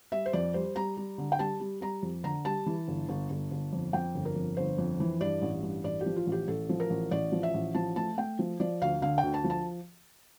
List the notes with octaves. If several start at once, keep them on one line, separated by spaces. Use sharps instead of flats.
G3 E5
C5
F2 D5
G3 C5
G3 A#5
G3
D3
G5
G3 A5
G3
G3 A#5
F2
D3 A#5
G3 A5
E3
G1
G1
G1
G1
F2
F2 G5
G1
A#4
F2
G1 C5
F2
E3
G2 D5
A1
G2
A1 D5
G4
F3
F4
A1
G4
A1 A4
F3
A#4
A1
A1 D5
F3
E5
A1
F3 A5
A3 A5
A3 G5
F3
F3 D5
D2 F5
D3 F5
G5
D2
A5
F3
A5